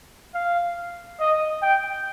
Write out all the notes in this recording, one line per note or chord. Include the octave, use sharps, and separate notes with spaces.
F5
D#5
G5